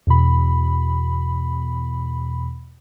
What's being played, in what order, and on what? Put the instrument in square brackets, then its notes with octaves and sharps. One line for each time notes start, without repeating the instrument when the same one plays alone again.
[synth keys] E2 B2 B5